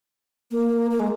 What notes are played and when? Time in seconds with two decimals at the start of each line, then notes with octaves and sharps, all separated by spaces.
0.51 A#3
0.91 A#3
1.00 G#3